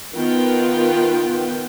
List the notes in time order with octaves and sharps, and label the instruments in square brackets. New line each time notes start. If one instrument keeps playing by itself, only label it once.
[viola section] D#3 B3 F4 G5